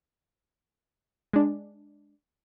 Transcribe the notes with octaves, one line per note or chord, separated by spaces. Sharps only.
G#3 D4